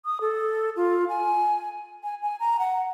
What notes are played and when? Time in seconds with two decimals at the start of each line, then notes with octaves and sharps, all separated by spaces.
0.05 D#6
0.21 A4
0.76 F4
1.09 G#5
2.03 G#5
2.22 G#5
2.40 A#5
2.59 F#5